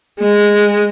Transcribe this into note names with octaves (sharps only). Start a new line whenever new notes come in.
G#3